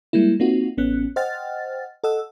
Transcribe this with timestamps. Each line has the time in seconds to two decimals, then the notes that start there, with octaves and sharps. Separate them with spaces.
0.13 G3 G#3 A#3 E4
0.40 A#3 C4 D#4 F4 F#4
0.78 A1 B3 C#4 F#6
1.16 C5 D#5 F#5 G5 F6 A6
2.04 A4 D#5 F#5 E6